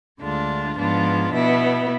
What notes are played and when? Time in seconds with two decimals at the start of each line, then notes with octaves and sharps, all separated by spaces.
0.20 D2 D3 G#3 D4 F4
0.77 G#2 F3 B3 D4 F4
1.32 B2 B3 E4